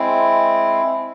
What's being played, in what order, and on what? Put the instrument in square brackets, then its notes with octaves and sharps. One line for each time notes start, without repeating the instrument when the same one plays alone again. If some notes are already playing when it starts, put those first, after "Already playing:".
Already playing: [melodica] G#3 C4 E4